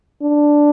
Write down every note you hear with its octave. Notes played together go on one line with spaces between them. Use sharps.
D4